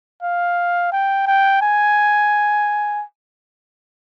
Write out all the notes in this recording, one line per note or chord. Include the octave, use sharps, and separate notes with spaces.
F5
G5
G5
G#5